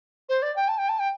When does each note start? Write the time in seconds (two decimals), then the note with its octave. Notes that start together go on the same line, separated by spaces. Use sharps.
0.29 C5
0.42 D5
0.55 G5
0.68 A5
0.78 G5
0.88 A5
0.99 G5